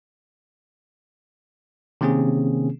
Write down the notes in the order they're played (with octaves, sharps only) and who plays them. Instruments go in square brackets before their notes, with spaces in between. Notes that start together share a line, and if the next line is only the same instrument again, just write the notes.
[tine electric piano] C3 D#3 A#3 C4 C#4 G#4